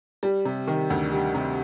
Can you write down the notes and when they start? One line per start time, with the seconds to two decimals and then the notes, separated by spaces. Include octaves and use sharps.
0.23 G3
0.45 C3
0.67 D#3
0.90 D2
1.12 G3
1.35 C3